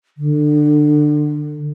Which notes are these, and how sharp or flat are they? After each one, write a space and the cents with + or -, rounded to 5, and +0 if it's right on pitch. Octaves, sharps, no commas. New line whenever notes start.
D3 +25